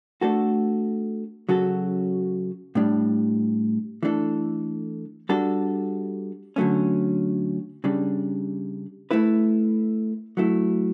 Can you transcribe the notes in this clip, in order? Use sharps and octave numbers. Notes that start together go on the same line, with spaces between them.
A3 D4 F#4 A4
C#3 F#3 C#4 F#4 A4
A2 G3 D4
E3 A3 D4 A4
G3 D4 F#4 A4
D3 F#3 A3 C#4
C#3 G3 D4
A3 E4 B4
F#3 A3 E4